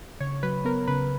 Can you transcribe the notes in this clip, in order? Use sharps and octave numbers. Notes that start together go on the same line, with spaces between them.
C#3 C#5
F#3 B4
B3 A#4
C#3 B4